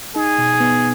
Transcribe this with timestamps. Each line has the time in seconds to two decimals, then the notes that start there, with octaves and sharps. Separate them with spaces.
0.15 D#4 G#4
0.38 B2
0.60 B3